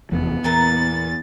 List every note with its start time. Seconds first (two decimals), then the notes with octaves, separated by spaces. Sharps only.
0.12 F1 E2 F3 B3
0.44 E2 A#2 E3 A#4 A6